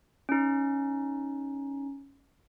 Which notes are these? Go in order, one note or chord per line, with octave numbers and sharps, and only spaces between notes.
C#4 D#4